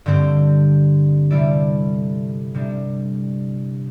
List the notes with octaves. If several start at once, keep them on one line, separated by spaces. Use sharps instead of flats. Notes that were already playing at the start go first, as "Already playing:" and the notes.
G2 D3 C4 G4 C5
C3 G3 E4 A4 D5
C3 G3 D4